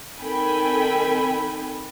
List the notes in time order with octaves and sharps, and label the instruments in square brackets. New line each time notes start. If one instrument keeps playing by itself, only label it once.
[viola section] D#3 C4 A4 G5 G#5 B5